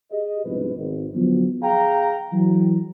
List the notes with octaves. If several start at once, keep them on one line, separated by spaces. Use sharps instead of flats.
G4 G#4 D#5
C2 G#2 B2 F3 D4 B4
G#1
D3 F3 F#3 B3
G#4 F5 G5 A#5
E3 F#3